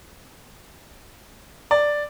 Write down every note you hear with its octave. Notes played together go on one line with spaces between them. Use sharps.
D5